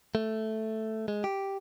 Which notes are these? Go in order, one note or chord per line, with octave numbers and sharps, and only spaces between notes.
A3
G#3
G4